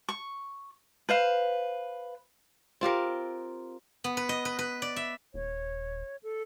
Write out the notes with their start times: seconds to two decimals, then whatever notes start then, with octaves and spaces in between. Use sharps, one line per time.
0.09 C#6
1.09 B4 C5 F5
2.81 C4 F4 G4 A#4
4.04 B3
4.17 B4
4.29 D#5
4.45 B4
4.59 B4
4.82 D5
4.96 E5
5.34 D#1 C#5
6.23 A4